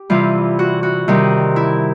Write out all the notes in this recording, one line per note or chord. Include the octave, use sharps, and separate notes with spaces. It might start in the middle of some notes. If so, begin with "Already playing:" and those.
Already playing: G4
C3 E3 G3 F4
F#4
F#4
C3 D#3 G3
E4